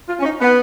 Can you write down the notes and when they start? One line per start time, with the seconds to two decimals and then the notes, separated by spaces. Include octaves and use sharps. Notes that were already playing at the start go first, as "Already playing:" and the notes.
0.08 F4
0.20 C#4
0.25 D#4
0.41 B3